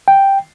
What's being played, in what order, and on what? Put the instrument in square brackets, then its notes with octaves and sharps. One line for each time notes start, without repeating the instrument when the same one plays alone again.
[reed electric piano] G5